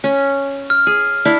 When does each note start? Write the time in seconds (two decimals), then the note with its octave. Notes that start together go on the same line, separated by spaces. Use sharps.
0.04 C#4
0.70 F6
0.87 G#4
1.25 D4 E4 F5